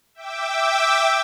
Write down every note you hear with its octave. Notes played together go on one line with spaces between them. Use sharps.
E5 G5 D6 E6